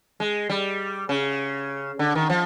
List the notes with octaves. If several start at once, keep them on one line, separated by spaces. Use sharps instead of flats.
G#3
G3
C#3
D3
D#3
F3